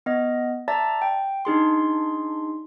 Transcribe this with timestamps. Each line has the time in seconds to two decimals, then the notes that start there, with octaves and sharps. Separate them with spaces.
0.06 B3 D#5
0.68 D5 E5 A5 A#5 A6
1.02 G5
1.45 D4 D#4 G#4 C6